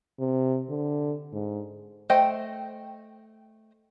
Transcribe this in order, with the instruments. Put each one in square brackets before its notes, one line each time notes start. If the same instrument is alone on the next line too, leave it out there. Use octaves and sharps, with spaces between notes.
[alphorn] C3
D3
G#2
[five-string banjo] A3 C5 D#5 G5 G#5